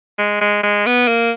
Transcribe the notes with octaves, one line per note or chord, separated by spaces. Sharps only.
G#3
G#3
G#3
B3
A#3